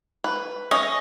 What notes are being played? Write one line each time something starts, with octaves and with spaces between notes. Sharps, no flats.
B4
C#4 D#5